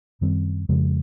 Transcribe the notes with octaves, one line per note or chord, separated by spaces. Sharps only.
F#2 D#3 G3 C4
F2 C#3 F3 G#3